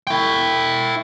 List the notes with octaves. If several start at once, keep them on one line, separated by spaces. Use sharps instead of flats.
E4 G5